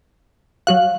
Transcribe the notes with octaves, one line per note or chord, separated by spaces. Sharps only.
F#3 F#4 F5 F#6